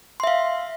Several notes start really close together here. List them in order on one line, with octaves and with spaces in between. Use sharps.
C6 E5 F5